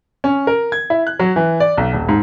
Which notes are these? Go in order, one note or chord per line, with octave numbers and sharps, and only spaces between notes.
C#4
A#4
G#6
E4
F#6
F#3
E3
D5
B1
D#1
G#2